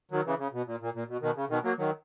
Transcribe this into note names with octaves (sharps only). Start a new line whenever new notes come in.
D#3 F#3
C#3 E3
C#3
B2
A#2
A#2
A#2
B2
B2 D#3
C#3
B2 D#3
F#3 A#3
D#3 F#3